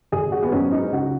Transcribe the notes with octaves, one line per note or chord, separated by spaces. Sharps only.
G#1 G#4
F#4
B3
G#2 F#3 C#4
D#4
C#2 F#4